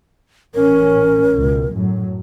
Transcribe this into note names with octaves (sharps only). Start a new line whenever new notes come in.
A1 A2 C#4 A#4
C#2 B2
F#2 A2 F#3